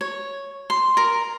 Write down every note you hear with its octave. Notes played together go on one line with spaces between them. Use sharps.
C#5
C6
A#4